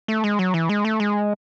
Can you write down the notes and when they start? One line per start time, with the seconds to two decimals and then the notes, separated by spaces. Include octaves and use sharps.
0.08 A3
0.24 G#3
0.39 F#3
0.54 E3
0.69 G#3
0.85 A3
1.00 G#3